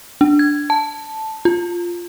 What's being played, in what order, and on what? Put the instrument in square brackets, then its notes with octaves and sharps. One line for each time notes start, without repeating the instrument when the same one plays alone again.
[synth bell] D4
G#6
A5
F4